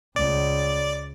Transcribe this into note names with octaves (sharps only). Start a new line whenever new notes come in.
C#2 D5